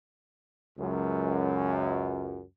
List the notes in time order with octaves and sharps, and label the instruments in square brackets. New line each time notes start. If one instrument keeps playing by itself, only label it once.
[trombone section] C#2 F#2